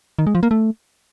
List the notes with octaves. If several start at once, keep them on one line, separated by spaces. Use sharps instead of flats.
D#3
G#3
F3
A#3
A3